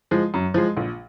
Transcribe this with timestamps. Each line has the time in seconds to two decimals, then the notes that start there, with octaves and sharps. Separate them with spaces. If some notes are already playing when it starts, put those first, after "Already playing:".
0.11 F3 G#3
0.34 F#2
0.54 F3 G#3
0.77 A#1